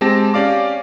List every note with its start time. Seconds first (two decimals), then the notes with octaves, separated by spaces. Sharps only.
0.01 G#3 C4 G4 A5 A#6
0.34 C#4 G4 D5 F5 D6